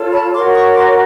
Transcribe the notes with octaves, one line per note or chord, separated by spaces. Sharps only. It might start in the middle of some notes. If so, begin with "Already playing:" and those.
Already playing: F4 A4 C#5
A5 B5
F#4 A#4 C#5 C6 D6
C#6 D#6
C6 D6